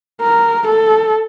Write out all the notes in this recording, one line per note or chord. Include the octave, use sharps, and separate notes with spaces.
A#4
A4